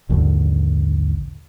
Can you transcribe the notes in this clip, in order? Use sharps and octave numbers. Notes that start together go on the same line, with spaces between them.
A#1 D#2 G#2 D3